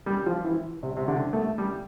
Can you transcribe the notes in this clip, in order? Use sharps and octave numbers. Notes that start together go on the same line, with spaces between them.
G3
F3
E3
C3
C3
D3
A3
G3